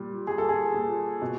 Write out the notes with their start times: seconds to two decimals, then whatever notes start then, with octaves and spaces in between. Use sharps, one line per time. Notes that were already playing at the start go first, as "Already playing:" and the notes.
Already playing: A#2 G3
0.27 G3 G#4
0.38 A4
0.49 G#4
0.74 A#2
1.22 B2